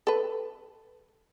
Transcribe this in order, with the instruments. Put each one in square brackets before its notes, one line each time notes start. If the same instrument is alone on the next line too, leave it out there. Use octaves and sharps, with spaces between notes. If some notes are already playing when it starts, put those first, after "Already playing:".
[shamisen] A4 B4